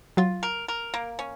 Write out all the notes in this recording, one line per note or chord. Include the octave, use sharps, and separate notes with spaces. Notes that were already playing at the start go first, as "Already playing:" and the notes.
F#3 F4
A#4
A#4
A#3
C#4